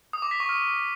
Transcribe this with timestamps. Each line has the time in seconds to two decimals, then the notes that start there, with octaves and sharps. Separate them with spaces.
0.13 D#6
0.22 D6
0.31 B6
0.40 C#6
0.49 F6